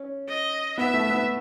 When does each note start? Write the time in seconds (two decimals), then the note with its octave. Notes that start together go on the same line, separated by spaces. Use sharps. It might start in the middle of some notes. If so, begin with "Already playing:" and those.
Already playing: C#4
0.28 D#5
0.78 B3 E5
0.94 A3
1.10 B3